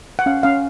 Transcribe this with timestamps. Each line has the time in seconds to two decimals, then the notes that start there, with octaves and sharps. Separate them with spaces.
0.19 F#5
0.26 C#4 F5
0.43 C#4 F5